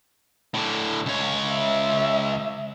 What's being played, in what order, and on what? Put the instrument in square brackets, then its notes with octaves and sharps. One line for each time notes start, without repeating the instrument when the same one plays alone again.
[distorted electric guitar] A2 D3
C#2 C#5
[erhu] E5